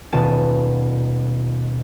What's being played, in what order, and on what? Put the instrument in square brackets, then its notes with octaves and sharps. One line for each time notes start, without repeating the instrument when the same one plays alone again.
[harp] D#1 B2 F4 A5 D#7 E7